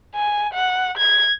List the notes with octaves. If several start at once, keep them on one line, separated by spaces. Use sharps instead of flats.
G#5
F#5
G#6